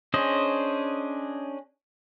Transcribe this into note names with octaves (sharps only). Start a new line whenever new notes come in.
C#4 D4 G#4 C5 D#5